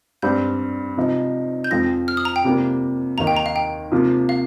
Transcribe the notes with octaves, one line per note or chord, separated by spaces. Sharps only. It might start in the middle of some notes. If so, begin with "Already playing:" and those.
G2 G3 C4 G6
C3 F3 D#4
G6
F2 F3 C4 A#6
F6
D#6
A#5
G5
C3 G3 A#3 F4
D#2 D#3 A#3 A#5
G5
A#5
F5
G5
C3 F3 A#3 F4
F5